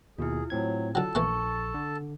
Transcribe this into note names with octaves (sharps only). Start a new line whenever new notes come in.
D#2 B2 E4 F4 G#4
A2 F#3 C4 G#6
D3 F#3 A4 A5
A#1 E3 A3 A#3 C#6
D3